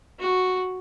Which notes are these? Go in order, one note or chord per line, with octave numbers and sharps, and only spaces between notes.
F#4